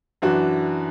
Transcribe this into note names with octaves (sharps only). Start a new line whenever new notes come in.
F#2 E3 D4 F#4